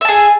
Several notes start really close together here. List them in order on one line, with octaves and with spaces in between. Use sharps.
E5 A5 G#4